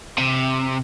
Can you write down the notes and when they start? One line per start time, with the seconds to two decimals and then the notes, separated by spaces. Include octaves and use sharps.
0.18 C3